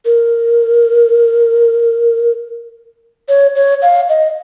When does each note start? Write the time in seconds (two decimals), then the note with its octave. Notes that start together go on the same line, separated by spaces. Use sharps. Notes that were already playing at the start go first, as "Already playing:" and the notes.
0.05 A#4
3.29 C#5
3.55 C#5
3.82 F5
4.09 D#5